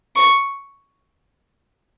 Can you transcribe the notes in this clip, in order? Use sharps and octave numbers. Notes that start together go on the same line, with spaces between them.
C#6